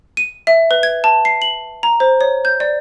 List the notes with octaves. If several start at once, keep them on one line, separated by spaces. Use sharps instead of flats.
D#7
E5
B4
G#6
A5
C7
F#7
A#5
C5
C#5
G6
D5